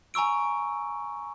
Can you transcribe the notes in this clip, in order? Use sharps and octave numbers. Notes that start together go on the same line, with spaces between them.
G#5 A#5 C#6 E6 D7